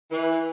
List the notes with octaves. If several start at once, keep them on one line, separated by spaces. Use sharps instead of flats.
E3